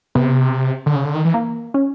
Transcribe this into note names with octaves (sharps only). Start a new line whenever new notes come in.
C3 B3
D3
C#3
D3
D#3
E3
A#3
C#4